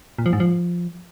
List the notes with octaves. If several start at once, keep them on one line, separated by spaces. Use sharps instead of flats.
A#2
F3
G#2
F3